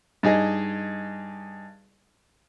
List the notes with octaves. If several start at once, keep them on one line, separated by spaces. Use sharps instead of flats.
G2 D#4 G#4 D#5